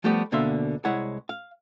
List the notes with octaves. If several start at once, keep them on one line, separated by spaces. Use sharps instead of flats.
F3 G3 A3 B3 G4
D2 B2 D3 A#3 E5 C6
C2 G#3 E4 C#5 F#5
F5